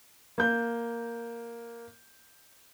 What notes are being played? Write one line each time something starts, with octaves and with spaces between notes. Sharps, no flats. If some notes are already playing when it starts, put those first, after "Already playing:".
A#3 G6